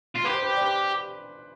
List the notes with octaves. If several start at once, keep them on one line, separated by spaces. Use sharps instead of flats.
F4
G4 B4 B5
C5 C6
B4 B5
D5 D6
B4 B5